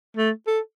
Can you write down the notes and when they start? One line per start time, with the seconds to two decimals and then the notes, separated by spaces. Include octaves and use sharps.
0.17 A3
0.47 A4